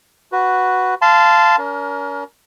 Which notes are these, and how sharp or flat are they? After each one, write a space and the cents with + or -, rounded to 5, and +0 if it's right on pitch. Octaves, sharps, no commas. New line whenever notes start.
F#4 +0 B4 +0
F5 -15 A5 -5 C6 -25
C#4 +45 A#4 +15